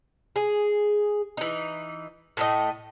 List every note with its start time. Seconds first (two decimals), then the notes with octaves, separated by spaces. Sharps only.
0.36 G#4
1.37 E3 D#4
2.37 A2 A3 D#5